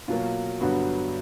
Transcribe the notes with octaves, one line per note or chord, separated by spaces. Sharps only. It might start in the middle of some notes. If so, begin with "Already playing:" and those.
B2 F#3 A#3 F4
G2 D3 F#3 B3 F#4